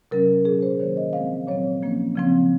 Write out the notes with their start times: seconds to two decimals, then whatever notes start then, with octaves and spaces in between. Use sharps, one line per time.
0.11 C3 F#3 C#4 A#4
0.45 A#2 F#3 C#4 G#4
0.62 C5
0.79 D#3 F#3 A#3 C#4 C#5
0.97 D#5
1.13 F3 G#3 C4 F5
1.47 A#2 F#3 C4 C#5
1.82 F3 A#3 C#4
2.16 C#3 F3 C4